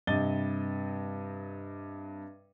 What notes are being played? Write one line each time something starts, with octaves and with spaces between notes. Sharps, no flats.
G2 C3 D#5 A6 G7